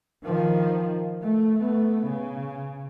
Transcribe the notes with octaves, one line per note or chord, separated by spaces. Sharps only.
D#3 F3
A3
A3 B3
C#3